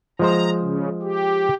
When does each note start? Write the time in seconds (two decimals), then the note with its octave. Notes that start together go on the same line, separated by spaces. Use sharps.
0.19 F3 G#3 C5 A#5
0.59 C#3
1.02 G4